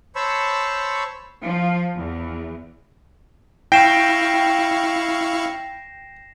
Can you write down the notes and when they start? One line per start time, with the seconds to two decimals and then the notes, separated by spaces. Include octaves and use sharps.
0.16 C5 C#5 A5 B5 C#6 E6
1.43 F3
1.96 E2
3.72 E4 F5 G5 C#6 A#6 C7 E7